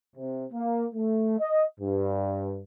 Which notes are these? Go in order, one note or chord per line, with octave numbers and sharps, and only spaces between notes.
C3
A#3
A3
D#5
G2